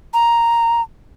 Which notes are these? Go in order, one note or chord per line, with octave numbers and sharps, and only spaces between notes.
A#5